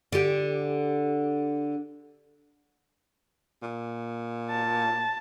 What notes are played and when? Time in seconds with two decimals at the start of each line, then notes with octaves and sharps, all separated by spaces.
0.12 D3 G4
3.62 A#2
4.50 A5